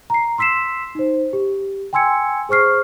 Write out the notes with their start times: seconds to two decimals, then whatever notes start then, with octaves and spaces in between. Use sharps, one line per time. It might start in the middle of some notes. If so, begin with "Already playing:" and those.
0.10 A#5 C7
0.38 C6 E6 B6 C7 E7
0.95 D#4 C5
1.33 G4
1.93 G5 G#5 C6 E6 G#6 C#7
2.49 G#4 C5 C#6 F6 C7